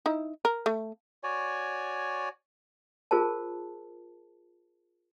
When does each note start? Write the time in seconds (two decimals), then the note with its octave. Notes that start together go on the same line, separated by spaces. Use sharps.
0.06 D#4 E4
0.45 A#4
0.66 A3
1.23 F#4 C#5 D5 G#5
3.11 F4 G#4 A#4 C5 A5